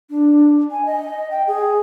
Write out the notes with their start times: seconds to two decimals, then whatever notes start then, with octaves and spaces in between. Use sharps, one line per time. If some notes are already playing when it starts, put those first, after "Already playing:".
0.10 D4
0.71 G#5
0.86 D#5
1.31 G5
1.48 G#4